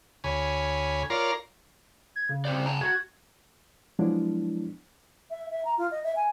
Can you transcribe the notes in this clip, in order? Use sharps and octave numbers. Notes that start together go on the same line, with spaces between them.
D2 C#5 G#5 B5
F4 A#4 C#5 D5 A#5 C6
G#6
C#3
C4 C5 D5
G5 A5 A#5
F#4 G#6
F3 F#3 G#3 B3 D4 E4
E5
E5
A#5
F4
D#5
E5
G#5